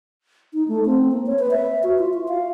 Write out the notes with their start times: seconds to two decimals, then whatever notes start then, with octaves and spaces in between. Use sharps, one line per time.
0.54 D#4
0.68 A3
0.85 C4
1.11 A#3
1.26 C#5
1.39 B4
1.51 E5
1.83 F#4
1.99 F4
2.13 F4
2.28 F5